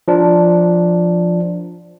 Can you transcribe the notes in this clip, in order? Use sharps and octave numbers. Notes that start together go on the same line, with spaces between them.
F3 D4